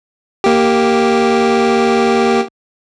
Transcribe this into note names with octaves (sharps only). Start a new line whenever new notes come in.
A#3 G4